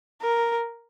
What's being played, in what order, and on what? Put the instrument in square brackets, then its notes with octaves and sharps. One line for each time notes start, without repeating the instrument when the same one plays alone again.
[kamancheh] A#4